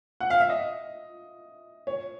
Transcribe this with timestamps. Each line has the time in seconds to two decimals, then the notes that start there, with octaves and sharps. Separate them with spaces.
0.20 F#5
0.30 F5
0.41 E5
0.49 D#5
1.87 C#5